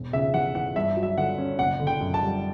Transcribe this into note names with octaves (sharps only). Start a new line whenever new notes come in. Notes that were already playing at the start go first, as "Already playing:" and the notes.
Already playing: E1
C#3 E5
E2 F#5
E3 F#5
G2 E5
F#3
E5
D3 F#5
C#4
F#1 F#5
D3
G5
F#2
A5
G3